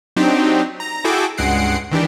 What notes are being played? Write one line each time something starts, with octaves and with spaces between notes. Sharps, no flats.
F#3 C4 D4 D#4 G4
A#5
E4 F#4 G#4 A4 G5 D6
C#2 G2 G#3 F#5 C7 D7
D#3 E3 D4 G4